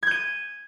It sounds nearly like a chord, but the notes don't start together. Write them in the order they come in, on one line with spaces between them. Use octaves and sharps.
G#6 G6 D#7